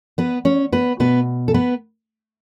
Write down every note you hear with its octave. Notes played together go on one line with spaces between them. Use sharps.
B3 B4
C#4 C#5
B3 B4
B2 B3 B4
A4
B3 B4